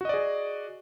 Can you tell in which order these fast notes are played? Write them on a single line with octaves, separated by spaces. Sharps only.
F#4 D#5 D5 G#4